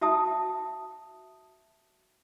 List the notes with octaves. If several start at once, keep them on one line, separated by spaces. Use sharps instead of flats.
F#4 E5 A5 D#6